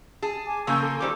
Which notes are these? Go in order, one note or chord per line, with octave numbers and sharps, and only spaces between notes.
G#4 A5
G#5 D6
C#3 F3 A#3 G#5 C#6 E6 G6
A4 C6
D#3 G3 G4 A4 C5 D6